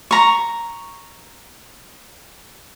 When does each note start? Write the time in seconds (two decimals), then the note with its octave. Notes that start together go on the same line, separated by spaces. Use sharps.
0.11 A#5 C#6